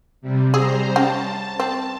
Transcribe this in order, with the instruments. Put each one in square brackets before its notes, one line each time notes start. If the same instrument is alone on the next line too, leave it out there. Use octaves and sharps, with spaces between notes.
[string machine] C3 G3
[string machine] G3 C5 A#5 [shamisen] G#4
[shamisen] C#4 G5 [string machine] A5
[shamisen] C4